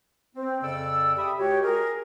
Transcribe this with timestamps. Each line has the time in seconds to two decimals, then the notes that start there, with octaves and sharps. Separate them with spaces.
0.34 C4
0.62 F2 C#3 A4 D5 E6
1.16 G4 E5 B5 D#6
1.38 C#2 F#4 G4 C#5
1.63 G#4 A#4